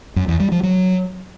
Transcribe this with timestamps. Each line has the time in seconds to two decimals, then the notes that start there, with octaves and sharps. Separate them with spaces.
0.16 F#2
0.28 E2
0.40 G3
0.52 F3
0.63 F#3